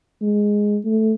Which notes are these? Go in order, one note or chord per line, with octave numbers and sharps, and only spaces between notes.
G#3
A3